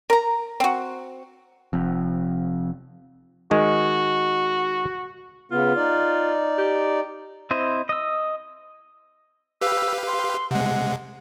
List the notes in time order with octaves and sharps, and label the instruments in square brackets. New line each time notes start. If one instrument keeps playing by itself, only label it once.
[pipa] A#4 A#5
C4 F#4
[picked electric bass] F1 F2
[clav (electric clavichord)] D#3 G#3 [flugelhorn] F#4
[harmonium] C#3 B3 [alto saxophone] F4
[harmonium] D#4 D5
[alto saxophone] G4
[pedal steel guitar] C4 E4 C5 D#5
D#5 E6
[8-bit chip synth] G4 B4 F5 [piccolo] E6
[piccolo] C6
[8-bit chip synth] C3 G#3 [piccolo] F#5